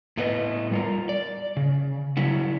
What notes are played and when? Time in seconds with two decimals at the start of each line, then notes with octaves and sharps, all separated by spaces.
0.17 A2 A3 B3 B4 D5 D#5
0.72 G3 F4 A#4
1.09 D5
1.57 C#3
2.17 C#3 F#3 G3 E4 F#4